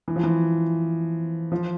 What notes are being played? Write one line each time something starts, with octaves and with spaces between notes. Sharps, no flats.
E3
F3
E3
F3